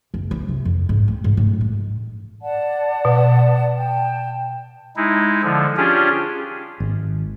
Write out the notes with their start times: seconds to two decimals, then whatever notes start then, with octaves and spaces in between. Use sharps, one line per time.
0.14 F#1
0.31 E4
0.48 C3
0.65 F2
0.89 G#2
1.08 C4
1.24 G#2
1.37 A2
1.61 G#3
2.42 D5 F#5 A5
3.05 B2
3.76 G5 A5
4.97 G#3 D#4 E4
5.43 D3 F3
5.77 C#4 D4 F4 G4 G#4
6.80 G#1